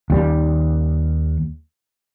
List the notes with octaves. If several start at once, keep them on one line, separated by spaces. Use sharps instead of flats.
D#2 G3